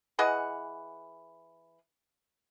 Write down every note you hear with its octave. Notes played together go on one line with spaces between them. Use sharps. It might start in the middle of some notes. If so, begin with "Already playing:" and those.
E3 G#4 D#5 F#5